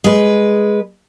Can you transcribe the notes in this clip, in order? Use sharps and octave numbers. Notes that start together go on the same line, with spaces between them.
G#3 B4